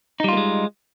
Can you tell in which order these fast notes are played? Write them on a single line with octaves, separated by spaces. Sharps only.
D#4 G3 F4 A#3 G#3